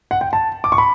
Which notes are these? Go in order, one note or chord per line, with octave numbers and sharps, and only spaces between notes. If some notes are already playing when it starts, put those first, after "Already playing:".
F#5
G5
A5
D6
C#6
B5